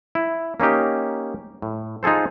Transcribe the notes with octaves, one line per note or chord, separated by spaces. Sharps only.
E4
A#3 C#4 D#4 G4
A2
D#4 F4 G#4 A4 C5